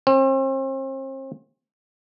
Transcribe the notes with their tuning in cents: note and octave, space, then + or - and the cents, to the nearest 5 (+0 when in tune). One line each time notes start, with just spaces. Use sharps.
C4 +40